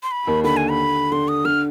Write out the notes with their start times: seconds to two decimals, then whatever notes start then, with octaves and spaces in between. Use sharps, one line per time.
0.03 C6
0.11 B5
0.27 D#2 D#3
0.44 D3 B5
0.57 G#5
0.70 B5
1.12 D3 C6
1.28 D#6
1.45 D3 F6